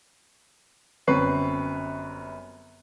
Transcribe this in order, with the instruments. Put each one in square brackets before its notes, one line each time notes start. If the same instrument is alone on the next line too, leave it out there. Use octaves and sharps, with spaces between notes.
[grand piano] G1 F#2 C4 B4 C#6 C7